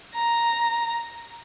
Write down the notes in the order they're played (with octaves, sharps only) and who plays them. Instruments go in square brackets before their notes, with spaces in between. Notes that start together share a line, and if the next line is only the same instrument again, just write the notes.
[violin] A#5